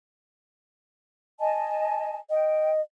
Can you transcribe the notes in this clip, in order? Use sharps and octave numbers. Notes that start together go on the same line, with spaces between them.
D#5 G#5 A5
D#5 G5